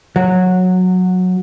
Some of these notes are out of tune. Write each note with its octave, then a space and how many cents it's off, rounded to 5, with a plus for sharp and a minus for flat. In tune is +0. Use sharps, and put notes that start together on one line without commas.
F#3 -15